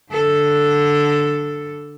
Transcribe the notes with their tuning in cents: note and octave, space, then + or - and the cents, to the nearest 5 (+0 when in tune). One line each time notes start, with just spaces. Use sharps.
D3 +0 A4 +0